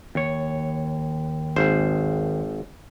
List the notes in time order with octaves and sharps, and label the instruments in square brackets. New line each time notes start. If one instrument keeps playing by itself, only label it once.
[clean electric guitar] D#2 C#5
[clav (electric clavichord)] G#1 C5